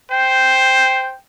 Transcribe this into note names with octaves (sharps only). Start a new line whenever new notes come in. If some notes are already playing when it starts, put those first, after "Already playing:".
C5 G5